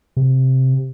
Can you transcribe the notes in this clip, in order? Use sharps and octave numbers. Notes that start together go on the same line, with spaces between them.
C3